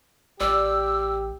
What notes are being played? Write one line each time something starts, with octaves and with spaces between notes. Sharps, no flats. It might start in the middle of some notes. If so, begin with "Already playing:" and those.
A1 G4 D5 E6